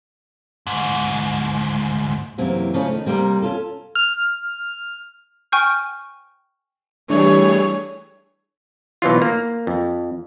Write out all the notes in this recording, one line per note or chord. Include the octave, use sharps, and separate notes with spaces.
D2 G#2
F#2 C3 E3 A#3 C4
C#3 F3 A3 C#4
D#3
C3 G3 A#3 C4 G4 A#4
C#4 F4 A4
F6
G5 G#5 C#6 F6 G6
E3 G3 A3 D4 G#4 C#5
B2 E3 F#3 F4
A#3
F2